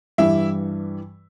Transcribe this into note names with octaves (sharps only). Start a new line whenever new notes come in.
G2 E3 G3 E4 E5